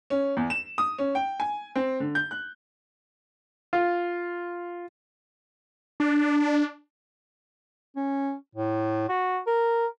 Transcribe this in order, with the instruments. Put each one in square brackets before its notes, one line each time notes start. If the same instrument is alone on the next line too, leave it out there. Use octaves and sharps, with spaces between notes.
[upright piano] C#4
E2
E7
D#6
C#4
G5
G#5
C4
D3
G6
F#6
[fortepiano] F4
[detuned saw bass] D4
[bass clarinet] C#4
A2
F#4
A#4